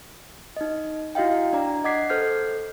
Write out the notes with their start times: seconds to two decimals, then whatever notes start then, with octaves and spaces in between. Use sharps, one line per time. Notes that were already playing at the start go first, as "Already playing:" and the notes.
0.57 D#4 D#5
1.15 E4 F#4 D#5 F5 G5
1.53 D4 D5 A#5
1.84 D#5 F#5 D6 G#6 B6 C7
2.09 A4 C5 F6 G6 C7